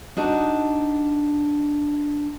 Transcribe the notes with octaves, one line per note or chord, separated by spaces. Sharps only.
D4 D#4 F#4